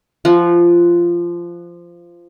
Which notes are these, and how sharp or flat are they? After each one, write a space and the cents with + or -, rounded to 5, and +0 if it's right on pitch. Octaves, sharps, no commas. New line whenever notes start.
F3 -15 F#4 +0